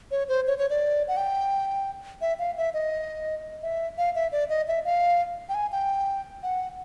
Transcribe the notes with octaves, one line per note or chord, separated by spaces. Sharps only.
C#5
C5
C#5
C#5
D5
F#5
G5
E5
F5
E5
D#5
E5
F5
E5
D5
D#5
E5
F5
G5
G#5
G5
F#5